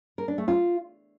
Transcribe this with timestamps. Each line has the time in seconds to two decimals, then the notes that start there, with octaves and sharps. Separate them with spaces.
0.18 A#4
0.28 D4
0.38 A3
0.48 F4